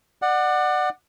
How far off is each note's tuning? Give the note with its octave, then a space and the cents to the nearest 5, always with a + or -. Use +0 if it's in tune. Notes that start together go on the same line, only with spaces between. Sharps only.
D5 +30 F#5 +0